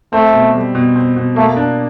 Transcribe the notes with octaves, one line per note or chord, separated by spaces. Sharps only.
A3 C4
B2
G3
B2
C4
B2
A3 A#3
D4